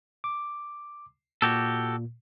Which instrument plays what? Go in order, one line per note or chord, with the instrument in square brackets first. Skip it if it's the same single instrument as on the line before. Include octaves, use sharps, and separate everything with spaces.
[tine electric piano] D6
[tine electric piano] A#2 [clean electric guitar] F#4 G4 A4